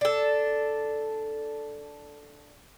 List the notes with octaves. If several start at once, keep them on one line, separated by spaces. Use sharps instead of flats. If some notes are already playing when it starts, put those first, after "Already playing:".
D4 A4